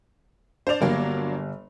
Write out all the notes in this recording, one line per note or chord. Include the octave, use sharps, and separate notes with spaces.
D4 C5 D5 F7
G1 F#3 G3 A#3 D4